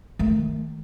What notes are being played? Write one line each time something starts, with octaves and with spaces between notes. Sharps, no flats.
D#3 A3